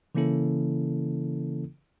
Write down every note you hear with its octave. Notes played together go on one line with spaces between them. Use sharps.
C#3 E3 A#3 C#4 E4 A4